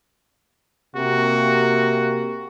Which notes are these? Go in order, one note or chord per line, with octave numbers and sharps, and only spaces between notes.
C3 A#3 F#4